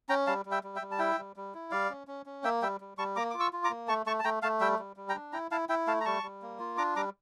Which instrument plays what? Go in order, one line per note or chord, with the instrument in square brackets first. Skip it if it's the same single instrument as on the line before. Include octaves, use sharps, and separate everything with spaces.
[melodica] C#4 G5 A#5
G3 F5 A5
G3
E5 G5
G3
E5 G5
G3
A5
E4 E5 G5
G3
G3
E4
G3 D5 F5
C#4
C#4
C#4
A#3 E5 G5
G3 E5 G5
G3
G3 A5 C#6
A#3 A#5 D6
F4 D6
C#6 E6
F4
A#5 D6
A#3
A3 A5 C#6
A3 A5 C#6
A5
A3 G5 A#5
A3 F5 A5
G3 E5 G5
G3
G3
G5 A#5
D4
E4 G5 A#5
E4 F5 A5
E4 E5 G5
A3 F5 A5
A#5
G3 A5 C#6
G3
A#3
F4
D4 A#5 D6
G3 A#5 D6